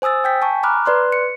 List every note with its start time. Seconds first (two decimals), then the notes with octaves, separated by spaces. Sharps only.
0.02 C5 G#5 D#6 E6 A6
0.24 G5 G6 B6
0.42 G#5 A5 C#6
0.63 A#5 B5 D6 F6 F#6
0.86 B4 D5 C6 F#6
1.12 C#7